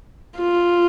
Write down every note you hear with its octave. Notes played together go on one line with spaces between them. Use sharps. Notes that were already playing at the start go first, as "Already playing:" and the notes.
F4